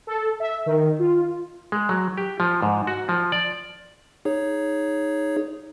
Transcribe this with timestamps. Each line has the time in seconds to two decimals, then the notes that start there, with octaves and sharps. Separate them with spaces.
0.07 A4
0.40 E5
0.66 D#3
0.99 F4
1.72 G#3
1.89 F#3
2.18 G4
2.40 F3
2.62 G#2
2.87 F#4
3.09 F3
3.32 D5
4.25 D#4 G#4 C#5